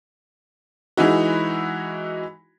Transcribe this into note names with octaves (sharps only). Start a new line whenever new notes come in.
E3 G#3 D#4 E4 F#4